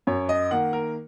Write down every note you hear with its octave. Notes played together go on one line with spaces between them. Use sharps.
F#2 C#5
D#5
D#3 A#3 F#5
A#4